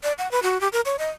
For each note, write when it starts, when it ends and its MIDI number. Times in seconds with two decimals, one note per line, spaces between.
0.03 0.13 74
0.19 0.30 78
0.31 0.40 71
0.43 0.61 66
0.61 0.68 67
0.73 0.81 70
0.86 0.96 73
0.99 1.09 75